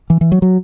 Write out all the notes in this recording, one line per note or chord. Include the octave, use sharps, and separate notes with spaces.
E3
E3
F#3
F#3